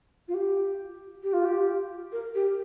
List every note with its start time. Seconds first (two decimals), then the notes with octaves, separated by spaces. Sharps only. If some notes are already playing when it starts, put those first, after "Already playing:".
0.28 F4
0.34 G4
1.23 G4
1.33 F4
1.45 G4
2.12 A#4
2.35 G4